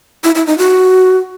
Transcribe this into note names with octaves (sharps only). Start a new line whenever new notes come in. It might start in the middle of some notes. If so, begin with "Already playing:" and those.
E4
E4
D#4
F#4